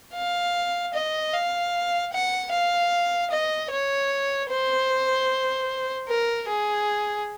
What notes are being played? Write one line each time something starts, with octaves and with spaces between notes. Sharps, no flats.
F5
D#5
F5
F#5
F5
D#5
C#5
C5
A#4
G#4